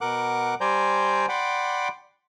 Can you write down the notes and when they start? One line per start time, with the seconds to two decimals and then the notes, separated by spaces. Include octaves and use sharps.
0.01 B2 A#4 F#5 D6 F#6
0.61 G3 C5 D5 G#5 A#5 G6
1.29 D5 F#5 G5 B5 C6 D6